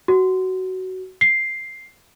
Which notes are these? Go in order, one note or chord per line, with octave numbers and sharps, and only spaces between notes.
F#4
C7